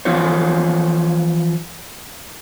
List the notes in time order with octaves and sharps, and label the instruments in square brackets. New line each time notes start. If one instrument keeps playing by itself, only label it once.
[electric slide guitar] E3 F3 C#4 F4 C5 C#5